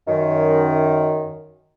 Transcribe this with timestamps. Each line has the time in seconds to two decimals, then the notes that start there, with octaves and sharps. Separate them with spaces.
0.08 F#2 D#3